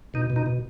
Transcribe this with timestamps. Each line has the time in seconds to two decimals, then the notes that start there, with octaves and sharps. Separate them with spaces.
0.14 B2 D#4
0.30 B2
0.36 D#4
0.46 B2